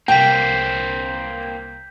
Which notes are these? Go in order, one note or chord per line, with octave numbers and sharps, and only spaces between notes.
C2 A#3 C4 G5 G6 B6